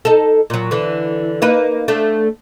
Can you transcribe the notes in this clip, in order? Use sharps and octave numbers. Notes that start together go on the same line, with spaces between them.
D#4 A4
A#2 F#3
D3 E3
A#3 D#4 B4
A3 D4